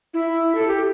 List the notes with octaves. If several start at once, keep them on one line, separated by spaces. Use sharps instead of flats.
E4
A4
G4